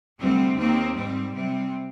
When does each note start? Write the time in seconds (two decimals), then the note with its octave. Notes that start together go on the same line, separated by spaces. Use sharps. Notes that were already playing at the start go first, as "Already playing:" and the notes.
0.18 D2 C3 G3 C4
0.56 D#2 D#3 A#3 C4
0.95 G#2 G3 C4
1.34 C3 G3 C4